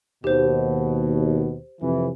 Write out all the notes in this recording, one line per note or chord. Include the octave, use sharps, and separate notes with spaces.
D#2 B2 G4 C5
F2 C3 E3